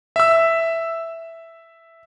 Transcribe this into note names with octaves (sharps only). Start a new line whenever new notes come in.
E5 E6